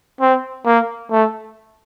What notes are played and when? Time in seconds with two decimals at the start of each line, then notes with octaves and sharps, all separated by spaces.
0.21 C4
0.65 A#3
1.11 A3